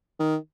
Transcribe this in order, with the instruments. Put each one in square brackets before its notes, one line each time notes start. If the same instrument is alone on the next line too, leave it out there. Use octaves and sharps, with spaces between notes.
[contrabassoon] D#3